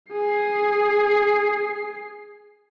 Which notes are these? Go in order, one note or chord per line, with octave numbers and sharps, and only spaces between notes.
G#4 C7